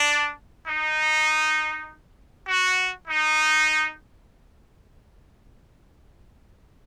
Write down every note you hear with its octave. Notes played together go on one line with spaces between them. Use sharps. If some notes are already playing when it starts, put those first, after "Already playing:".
Already playing: D4
D#4
F#4
D#4